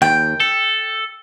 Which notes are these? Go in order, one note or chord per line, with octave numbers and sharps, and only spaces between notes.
D#2 G5
A4